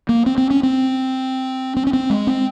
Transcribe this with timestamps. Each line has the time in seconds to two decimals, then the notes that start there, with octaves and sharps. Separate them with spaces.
0.09 A#3
0.26 C4
0.38 C4
0.51 C#4
0.63 C4
1.76 C4
1.87 C#4
1.93 C4
2.10 G#3
2.27 C4